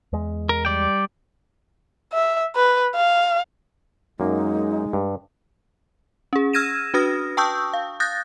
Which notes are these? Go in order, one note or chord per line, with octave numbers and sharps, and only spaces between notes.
E2 G#3
A#4
G3 D5 G5
E5
B4
F5
F#2 G#3 A#3 D#4
G2
C#4 G#4
E6 F6 G#6 A#6 D#7 E7
D4 F#4 B4 D#6 F6 A#6
G5 A5 C#6 D#6 E6 G6
F5
D#6 F#6 G6 A6 A#6